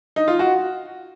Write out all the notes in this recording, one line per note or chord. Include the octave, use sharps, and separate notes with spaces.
D#4
F4
F#4